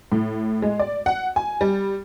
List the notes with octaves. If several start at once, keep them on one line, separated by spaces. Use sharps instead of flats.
A2
G#3
D5
F#5
G#5
G3